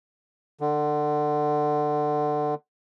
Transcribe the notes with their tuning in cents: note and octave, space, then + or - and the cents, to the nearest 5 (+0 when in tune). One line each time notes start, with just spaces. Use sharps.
D3 +25